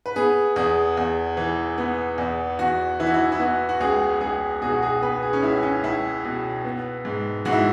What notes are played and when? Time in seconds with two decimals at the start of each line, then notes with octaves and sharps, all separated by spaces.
0.06 B4
0.16 B3 G#4
0.56 E2 G#4
0.97 E2
1.37 E3
1.78 B3
2.18 E2
2.59 E2 F#4
3.00 E3 E4
3.07 F#4
3.14 E4
3.32 E4
3.40 B3 F#4
3.69 F#4
3.81 C#2 G#4
4.21 C#2 G#4
4.61 B2 G#4
4.72 F#4
4.82 G#4
5.02 B3 B4
5.22 G#4
5.33 C#4
5.43 C#2 E4
5.63 C#4
5.84 C#2 E4
6.24 B2
6.65 B3
7.05 G#2
7.45 G#2 F#4
7.52 E4